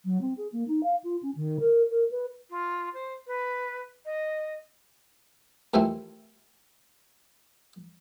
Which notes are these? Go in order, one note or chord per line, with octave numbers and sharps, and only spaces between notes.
F#3
C4
G#4
A#3
D#4
F5
F4
C#4
D#3
A#4
A#4
B4
F4
C5
B4
D#5
D#2 E3 F3 A3 C4